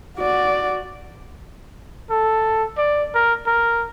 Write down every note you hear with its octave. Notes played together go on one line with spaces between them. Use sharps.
F#4 D5
A4
D5
A#4
A#4